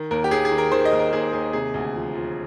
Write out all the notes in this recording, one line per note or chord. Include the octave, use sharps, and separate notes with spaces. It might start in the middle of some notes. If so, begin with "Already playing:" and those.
Already playing: D#3
D#2 A#4
G4
D#2 G#4
G#4
D#3
A#4
D#3 C5
D#5
D#2
A#4
D#2 G#4
D#2 G#4
C3 G#4
D2
F3
F3